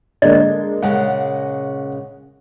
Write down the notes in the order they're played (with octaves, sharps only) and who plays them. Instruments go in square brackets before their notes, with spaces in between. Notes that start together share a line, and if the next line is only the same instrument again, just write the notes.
[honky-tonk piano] D3 G#3 A#3 [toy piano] D5 D#5
[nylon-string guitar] A#2 C#3 G#3 [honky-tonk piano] F#5